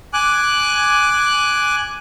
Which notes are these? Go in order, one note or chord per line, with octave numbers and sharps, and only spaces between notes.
G#5 D6 F#6